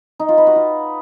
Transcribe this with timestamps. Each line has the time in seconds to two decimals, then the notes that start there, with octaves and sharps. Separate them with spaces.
0.19 D#4
0.29 F4
0.38 B4
0.47 F#4
0.56 F4